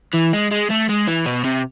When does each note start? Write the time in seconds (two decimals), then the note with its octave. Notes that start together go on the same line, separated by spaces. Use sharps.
0.14 E3
0.33 G#3
0.51 G#3
0.70 A3
0.89 G#3
1.07 E3
1.26 B2
1.44 C3